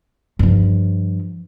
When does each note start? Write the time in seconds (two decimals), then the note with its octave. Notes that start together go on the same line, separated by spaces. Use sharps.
0.39 G2 F3